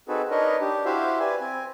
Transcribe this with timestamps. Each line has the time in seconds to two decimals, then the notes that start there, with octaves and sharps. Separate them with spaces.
0.08 C4 D#4 F#4 G#4 A4 B4
0.31 D4 D#4 A#4 B4 C#5 D#5
0.61 D4 G4
0.85 E4 F#4 G4 C5 E5 F5
1.20 B4 D5 G#5
1.41 C4 G#5